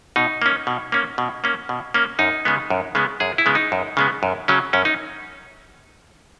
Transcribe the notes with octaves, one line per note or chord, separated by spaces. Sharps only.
B2 D#4
A#3 C#4
B2
A#3 C#4
B2
A#3 C#4
B2
A#3 C#4
F#2 D#4
C#3 G#3 B3
F#2
C#3 G#3 B3
F#2 G#4
E4
C#3 G#3 B3
D#4
F#2
C#3 G#3 B3
F#2
C#3 F#3 C#4
F#2 C#4
D#4